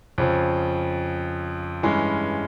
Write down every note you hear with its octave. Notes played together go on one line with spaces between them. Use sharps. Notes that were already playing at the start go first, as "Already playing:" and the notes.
F2 C#3 F3
G2 E3 G#3 C#4